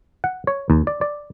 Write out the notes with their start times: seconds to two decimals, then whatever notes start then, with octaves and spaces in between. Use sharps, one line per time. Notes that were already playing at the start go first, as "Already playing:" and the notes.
0.24 F#5
0.47 C#5
0.70 D#2
0.87 D5
1.01 D5